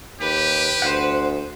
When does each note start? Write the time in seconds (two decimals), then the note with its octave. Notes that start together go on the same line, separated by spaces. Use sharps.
0.21 D#2 G4 B4
0.82 D2 C5 F#5